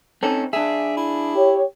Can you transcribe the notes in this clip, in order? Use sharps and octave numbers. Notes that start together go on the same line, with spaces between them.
C4 C#4 D#4 A4
D4 G#4 E5
E4
G4 C#5